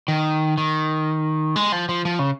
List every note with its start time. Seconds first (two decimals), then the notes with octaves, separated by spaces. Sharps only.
0.08 D#3
0.58 D#3
1.56 G#3
1.72 F3
1.89 F3
2.05 F3
2.19 C#3